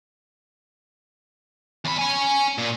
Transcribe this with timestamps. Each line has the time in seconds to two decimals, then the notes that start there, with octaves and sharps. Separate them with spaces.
1.85 E2 B5
1.99 C#5 G#5
2.58 A#2